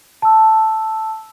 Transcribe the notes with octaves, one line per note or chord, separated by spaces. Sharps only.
A5 E6